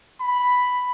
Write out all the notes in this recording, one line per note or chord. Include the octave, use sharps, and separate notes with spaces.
B5